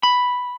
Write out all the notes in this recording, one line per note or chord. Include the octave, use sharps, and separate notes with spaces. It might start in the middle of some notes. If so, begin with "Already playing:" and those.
B5